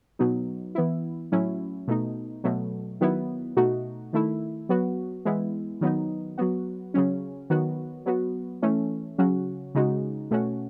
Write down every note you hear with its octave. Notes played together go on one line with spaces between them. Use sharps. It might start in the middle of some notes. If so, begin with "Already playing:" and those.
B2 F#3 B3 D#4
E3 B3 E4
A2 F#3 C#4 E4
B2 A3 D#4
B2 F#3 A3
D#3 F#3 B3 E4
B2 A3 D#4 F#4
D#3 A3 E4
F#3 B3 F#4
E3 G#3 B3 E4
D#3 F#3 B3 D#4
F#3 B3 F#4
C#3 F#3 C#4
D#3 F#3 B3 F#4
F#3 B3 F#4
E3 A3 C#4
C#3 F#3 C#4 F#4
C#3 G#3 D#4 F#4
B2 A3 C#4 F#4